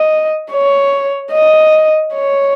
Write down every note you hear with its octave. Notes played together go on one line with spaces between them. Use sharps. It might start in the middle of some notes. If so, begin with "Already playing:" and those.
Already playing: D#5
C#5
D#5
C#5